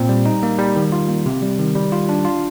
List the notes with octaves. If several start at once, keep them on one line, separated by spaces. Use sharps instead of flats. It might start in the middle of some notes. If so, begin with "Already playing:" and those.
Already playing: A#2 C4
G3
D#4
A#3
G3
D#3
F4
A#3
C3
G3
D#3
G3
F4
D4
F4